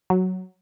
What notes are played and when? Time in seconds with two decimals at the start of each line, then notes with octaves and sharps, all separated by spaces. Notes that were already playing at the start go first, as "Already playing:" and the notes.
0.10 F#3